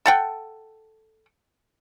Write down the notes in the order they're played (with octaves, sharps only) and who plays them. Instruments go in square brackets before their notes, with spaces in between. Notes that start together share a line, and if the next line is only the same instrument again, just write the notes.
[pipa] A4 F#5 G5